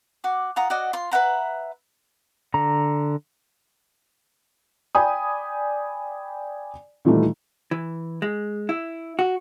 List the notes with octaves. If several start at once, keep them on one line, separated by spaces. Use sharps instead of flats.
F#4 D6
F4 F#5 A#5 D#6
F#4 D5 D#5 F#5
F4 C6
B4 E5 F#5 A#5
D3 A#5
D5 G5 G#5 B5 D#6
A#2 D#3 E3 G3 A3
E3
G#3
E4
F#4